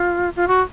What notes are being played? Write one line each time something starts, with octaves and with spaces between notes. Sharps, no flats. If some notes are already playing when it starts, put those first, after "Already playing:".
Already playing: F4
F4
F#4